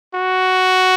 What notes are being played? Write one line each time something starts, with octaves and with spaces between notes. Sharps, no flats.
F#4